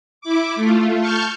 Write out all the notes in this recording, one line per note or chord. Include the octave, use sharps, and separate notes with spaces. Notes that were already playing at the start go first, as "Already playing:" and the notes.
E4 D6
A3 F4
A5 C#6 F6 G6